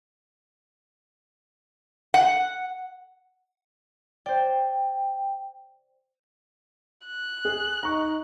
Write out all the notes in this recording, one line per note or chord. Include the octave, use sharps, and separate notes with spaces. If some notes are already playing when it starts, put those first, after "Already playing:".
F#5
C5 D5 G5
F#6
G#4
D#4 A#5 C#6